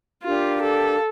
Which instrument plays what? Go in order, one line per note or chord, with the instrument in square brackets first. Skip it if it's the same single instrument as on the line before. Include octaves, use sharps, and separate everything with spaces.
[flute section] D4 G4 A#4 F5 [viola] F4
[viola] A4